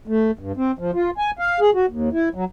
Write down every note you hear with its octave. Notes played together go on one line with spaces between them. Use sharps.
A3
G2
C4
F3
F4
G#5
F5
G#4
F#4
D#2
E4
F#3